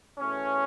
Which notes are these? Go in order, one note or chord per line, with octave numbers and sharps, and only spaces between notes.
E2 B2 A3 C#4